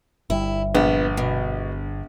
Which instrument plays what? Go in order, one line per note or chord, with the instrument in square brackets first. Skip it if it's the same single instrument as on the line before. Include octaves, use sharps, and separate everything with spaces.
[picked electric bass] G1 G3 [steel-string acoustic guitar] E4
[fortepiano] A#1 [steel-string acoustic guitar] B3
[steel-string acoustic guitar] B2